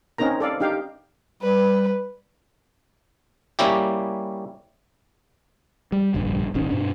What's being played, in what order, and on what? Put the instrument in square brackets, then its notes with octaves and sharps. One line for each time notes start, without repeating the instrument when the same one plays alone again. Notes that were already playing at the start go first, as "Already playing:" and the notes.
[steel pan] C4 C#4 D#4 A#4 A#5
A4 D5 F5
D4 D#4 G4 F5 G5
[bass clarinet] G3 [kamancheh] B4
[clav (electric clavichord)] G3 A#3 C#4 E4 G4
[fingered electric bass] G3
F1 A#1 G2 D3
D#1 G#1 D#3 C#4
G2 B2 D4